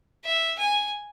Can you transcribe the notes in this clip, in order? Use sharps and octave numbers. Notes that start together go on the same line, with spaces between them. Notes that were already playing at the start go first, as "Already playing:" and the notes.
E5
G#5